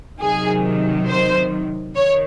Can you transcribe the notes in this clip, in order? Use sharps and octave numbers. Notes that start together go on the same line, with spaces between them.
C3 D#3 F#3 G#4
C5
D#3 C#5